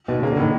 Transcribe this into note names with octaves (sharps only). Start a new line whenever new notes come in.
D#2 B2
C#3 A#3
D3
A2 D#3